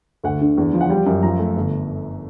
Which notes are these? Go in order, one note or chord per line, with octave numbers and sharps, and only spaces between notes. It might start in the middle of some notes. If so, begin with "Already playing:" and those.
D2 F#5
D3
E2
F3
F#5
G3 G5
F#2
F3 A#5
A3
G1